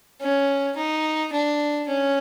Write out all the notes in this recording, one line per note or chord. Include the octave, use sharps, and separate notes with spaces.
C#4
D#4
D4
C#4